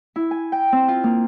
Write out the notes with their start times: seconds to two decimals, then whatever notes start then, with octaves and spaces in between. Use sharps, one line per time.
0.16 E4
0.31 G#5
0.52 G5
0.72 C4
0.88 F4
1.04 A#3